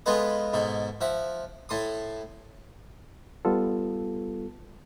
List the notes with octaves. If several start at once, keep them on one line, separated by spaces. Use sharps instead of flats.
G#3 B3 F4 A4 B4 D#5
G#2 B2 A4
F3 E5 F#5
A2 A4 C6 D#6
G3 B3 F4 A4